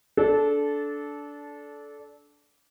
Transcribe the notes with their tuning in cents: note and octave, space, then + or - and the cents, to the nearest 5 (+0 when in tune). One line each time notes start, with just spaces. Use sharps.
D4 -15 A4 -20